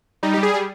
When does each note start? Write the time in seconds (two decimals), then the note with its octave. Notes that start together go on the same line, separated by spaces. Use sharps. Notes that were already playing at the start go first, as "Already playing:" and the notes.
0.23 G3 D#4
0.34 G3 G4
0.43 G#4
0.54 G3